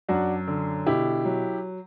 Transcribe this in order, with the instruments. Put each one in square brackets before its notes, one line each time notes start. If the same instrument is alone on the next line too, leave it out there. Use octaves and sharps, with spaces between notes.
[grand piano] F#2 D4 F#4
D3
B2 E4 G4
F#3